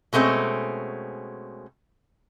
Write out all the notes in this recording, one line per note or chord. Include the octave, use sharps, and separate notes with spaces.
B2 G#3 A3 C4 C#4